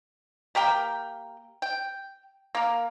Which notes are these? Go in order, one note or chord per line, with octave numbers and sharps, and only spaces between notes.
A#3 G4 A#4 G5
G5
A#3 A#4